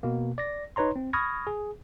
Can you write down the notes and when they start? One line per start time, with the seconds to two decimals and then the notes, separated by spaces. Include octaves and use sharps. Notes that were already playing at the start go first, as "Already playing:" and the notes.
0.03 B2 A#3
0.38 D5 A#6
0.76 D#4 B4 C#5 A#5 C6
0.96 C4
1.13 B5 C#6 D#6 F6 G#6 A#6
1.47 G#4